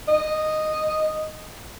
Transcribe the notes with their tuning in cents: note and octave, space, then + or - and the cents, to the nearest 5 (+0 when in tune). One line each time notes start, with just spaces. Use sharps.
D#5 -5